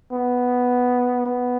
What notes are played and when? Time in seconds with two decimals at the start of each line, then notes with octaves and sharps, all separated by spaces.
0.12 B3
1.26 B3